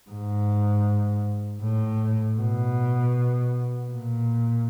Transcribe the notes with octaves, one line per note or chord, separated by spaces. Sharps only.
G#2
A2
B2
A#2